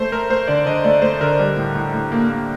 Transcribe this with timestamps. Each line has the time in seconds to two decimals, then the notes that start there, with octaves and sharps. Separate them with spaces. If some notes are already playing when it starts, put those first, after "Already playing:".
Already playing: A3 C5
0.12 A3 A#4
0.30 A3 C5
0.48 D3 D5
0.66 D3 D#5
0.84 A3 D5
1.02 A3 C5
1.21 D3 A#4
1.39 G3
1.56 A2
1.75 A2
1.94 A2
2.12 A#3
2.29 A#3